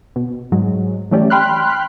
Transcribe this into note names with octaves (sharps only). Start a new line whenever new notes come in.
B2
G#2 F#3 G#3
E3 F#3 A3 C#4 G4 D5
G5 B5 C6 F6 F#6